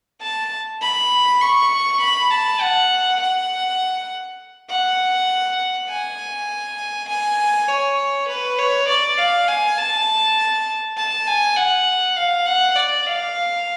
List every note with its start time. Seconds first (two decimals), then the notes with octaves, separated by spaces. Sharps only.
0.22 A5
0.82 B5
1.42 C#6
2.01 B5
2.31 A5
2.61 F#5
3.21 F#5
4.70 F#5
5.89 G#5
7.09 G#5
7.69 C#5
8.29 B4
8.58 C#5
8.88 D5
9.18 F5
9.48 G#5
9.78 A5
10.97 A5
11.27 G#5
11.57 F#5
12.16 F5
12.46 F#5
12.76 D5
13.06 F5